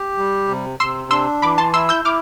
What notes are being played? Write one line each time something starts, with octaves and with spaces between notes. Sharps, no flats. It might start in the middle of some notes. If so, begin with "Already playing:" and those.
Already playing: G4
G3
C3
C3 C6 E6
D4 C6 E6
E3 B5 D6
A5 C6
E4 C6 E6
E6 G6
E4 D6 F6